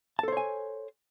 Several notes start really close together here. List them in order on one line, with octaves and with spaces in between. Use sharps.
A5 A4 C5 C#5 G#5